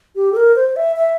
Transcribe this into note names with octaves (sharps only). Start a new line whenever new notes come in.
G4
A4
A#4
C5
E5
E5